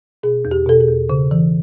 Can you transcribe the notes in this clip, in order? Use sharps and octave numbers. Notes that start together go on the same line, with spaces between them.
B2 G#4
E2
G4
B2 A4
G#4
E2
C#3
E3